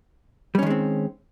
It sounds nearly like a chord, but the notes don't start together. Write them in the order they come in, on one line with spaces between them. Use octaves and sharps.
G3 C#4 D#3 G#3 C4